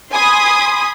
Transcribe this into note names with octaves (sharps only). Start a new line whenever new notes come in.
G#5 B5 C6 D#6